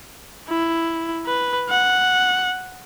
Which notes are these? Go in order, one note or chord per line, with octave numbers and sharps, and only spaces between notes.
E4
B4
F#5